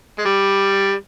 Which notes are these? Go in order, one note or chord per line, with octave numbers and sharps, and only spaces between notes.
G#3
G3